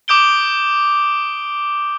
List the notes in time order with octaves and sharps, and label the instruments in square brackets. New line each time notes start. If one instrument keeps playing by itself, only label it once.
[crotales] D6 D#6 G6 D7 G7